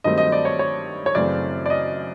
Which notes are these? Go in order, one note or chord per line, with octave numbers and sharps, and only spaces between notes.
G2 D#3 F#3 A3 C4 D#5
D#5
D5
C#5
C#5
C#5
F#2 C#3 E3 A3 C4 D5
D5
D#5